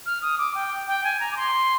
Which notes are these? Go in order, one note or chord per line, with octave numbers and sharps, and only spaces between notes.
F6
D#6
D6
G5
G5
G#5
A#5
D6
C6